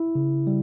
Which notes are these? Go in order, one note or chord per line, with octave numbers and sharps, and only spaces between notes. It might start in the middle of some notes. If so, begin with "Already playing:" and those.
Already playing: E4
C#3
G3